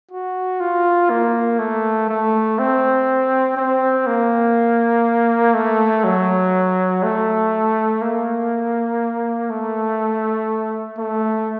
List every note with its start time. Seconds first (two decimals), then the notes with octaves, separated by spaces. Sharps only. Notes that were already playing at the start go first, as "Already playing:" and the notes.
0.11 F#4
0.60 F4
1.10 A#3
1.59 A3
2.09 A3
2.59 C4
3.57 C4
4.07 A#3
5.55 A3
6.04 F#3
7.03 A3
8.02 A#3
9.50 A3
10.98 A3